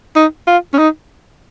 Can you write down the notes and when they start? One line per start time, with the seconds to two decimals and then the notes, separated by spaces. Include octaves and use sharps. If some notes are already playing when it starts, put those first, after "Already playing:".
0.16 D#4
0.47 F4
0.74 C#4
0.78 D#4